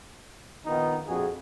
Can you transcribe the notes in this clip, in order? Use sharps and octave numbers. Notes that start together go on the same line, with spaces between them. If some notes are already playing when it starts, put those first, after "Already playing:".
A#1 D#3 B3 D#4 F4
A#1 F2 F#4 G#4